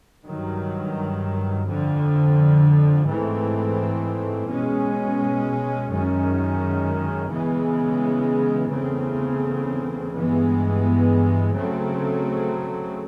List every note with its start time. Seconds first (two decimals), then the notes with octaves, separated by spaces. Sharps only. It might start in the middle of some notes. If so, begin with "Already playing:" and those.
0.25 G2 D#3 F#3
1.66 F2 D3 F3
3.07 G#2 E3 A3 C4
4.48 B2 G#3 C#4
5.90 F#2 D#3 G#3 C#4
7.31 C#3 E3 G#3 B3
8.71 E2 C#3 E3 A3 C4
10.12 G2 E3 G#3 B3
11.53 C#3 F#3 A3 C4